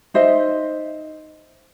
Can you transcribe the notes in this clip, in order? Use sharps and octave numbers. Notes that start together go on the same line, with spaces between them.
D#4 C5 D#5 E5